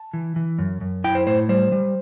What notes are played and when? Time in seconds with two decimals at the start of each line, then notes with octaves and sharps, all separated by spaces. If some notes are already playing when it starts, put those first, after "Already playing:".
Already playing: A5
0.13 E3
0.36 E3
0.59 F#2
0.81 F#2
1.04 E4 G5
1.15 C5
1.27 A2 C5
1.49 G3 C5
1.72 G3